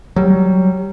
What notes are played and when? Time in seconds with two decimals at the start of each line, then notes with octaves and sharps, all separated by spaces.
0.16 F#3 G3